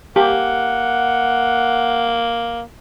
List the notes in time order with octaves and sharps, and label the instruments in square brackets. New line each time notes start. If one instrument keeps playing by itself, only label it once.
[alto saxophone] A#3 [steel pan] G4 [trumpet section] F#5